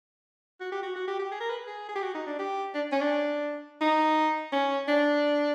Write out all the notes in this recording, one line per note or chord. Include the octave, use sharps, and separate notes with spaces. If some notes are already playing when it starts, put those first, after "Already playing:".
F#4
G4
F#4
F#4
G4
G4
G#4
A#4
B4
G#4
G#4
G4
F#4
D#4
D4
G4
D4
C#4
D4
D#4
C#4
D4